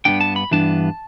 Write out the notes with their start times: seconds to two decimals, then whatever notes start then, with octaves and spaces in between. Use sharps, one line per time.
0.05 G2 E3 B3 D4 G5
0.21 A5
0.36 B5
0.51 G2 E3 B3 D4 A5